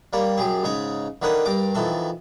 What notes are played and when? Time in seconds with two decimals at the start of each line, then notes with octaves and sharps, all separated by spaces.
0.13 G3 A#3 C#5
0.38 F#2 G4 G#4
0.63 G#2 C#3 D#4 C#5
1.22 D3 D#3 A#3 B4 C#5 D#6
1.45 G2 A#4 G5 D6
1.74 F2 D#3 E3 A4 C#6